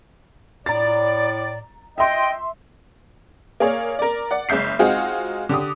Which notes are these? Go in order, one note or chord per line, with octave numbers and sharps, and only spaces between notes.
A2 D5 A#5 A6
D#5 E5 G5 C6
A#3 G#4 C#5 D5
A#4 D5
D5 F#5
F#1 G#3 E5 G6 C7
G#3 C4 D#4 F4 F#4 G#4
D3 G4 D6 D#6